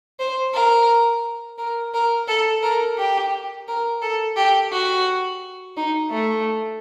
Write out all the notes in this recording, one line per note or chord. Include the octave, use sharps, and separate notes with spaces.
C5
A#4
A#4
A#4
A4
A#4
G4
A#4
A4
G4
F#4
D#4
A3